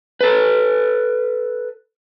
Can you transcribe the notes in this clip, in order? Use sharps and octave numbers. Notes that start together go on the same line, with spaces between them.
A4 B4